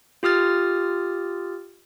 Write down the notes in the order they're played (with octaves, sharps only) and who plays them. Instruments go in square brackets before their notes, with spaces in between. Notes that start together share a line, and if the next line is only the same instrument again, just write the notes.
[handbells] F4 G4 D#6 F6 A6